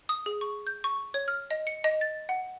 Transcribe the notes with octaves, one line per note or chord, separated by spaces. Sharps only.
D#6
G#4
C#6
G6
C#6
C#5
F6
D#5
C#7
D#5
A6
F#5